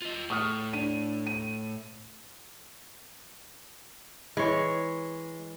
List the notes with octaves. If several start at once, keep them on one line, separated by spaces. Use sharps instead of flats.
F4 D#5
A2 C#6 D#6 F6
D4 D#7
D#7
E3 G#3 C#5